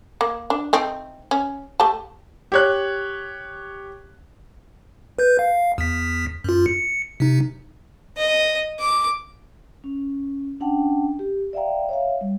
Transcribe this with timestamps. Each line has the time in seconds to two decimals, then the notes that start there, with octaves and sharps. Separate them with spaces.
0.21 A#3
0.50 D4
0.73 A3 C4 D#4
1.31 C#4
1.80 A3 G4 A5
2.52 G4 C#5 F#6
5.19 B4 G6
5.39 F5
5.78 E2 B6
6.44 F#2 F4
6.66 C#7
7.20 C3 D#4
8.17 D#5
8.80 D6
9.84 C#4
10.60 C#4 D4 F#5 G5 A5
11.19 G4
11.53 D5 E5 F5 G5 A#5
11.89 C#5 E5 F5
12.21 G3